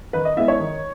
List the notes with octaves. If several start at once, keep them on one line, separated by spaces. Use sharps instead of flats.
D#3 B4
D#5
G#3 B3 E4 E5
C#5
D#3